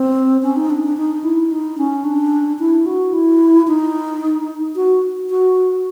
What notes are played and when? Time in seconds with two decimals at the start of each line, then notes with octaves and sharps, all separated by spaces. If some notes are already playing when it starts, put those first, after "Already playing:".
Already playing: C4
0.43 C#4
0.56 D#4
0.70 D4
0.83 D4
0.97 D#4
1.24 E4
1.51 D#4
1.78 C#4
2.04 D4
2.59 E4
2.86 F#4
3.13 E4
3.67 D#4
4.76 F#4
5.30 F#4